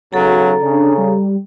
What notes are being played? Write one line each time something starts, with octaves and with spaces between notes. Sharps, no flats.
B1 C#3 F#3 A4 A#5
C#3 D4
G3